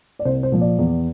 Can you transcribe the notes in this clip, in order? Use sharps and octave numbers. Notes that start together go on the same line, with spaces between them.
D5
C2 C5
C5
A#2 F3
D5
E2